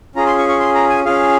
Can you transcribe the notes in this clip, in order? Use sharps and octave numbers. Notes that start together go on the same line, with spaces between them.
C#4 F4 G#4 A#5
C6
C#6
C#6
C6
A#5
G#5
C#4 F4 G#4 F5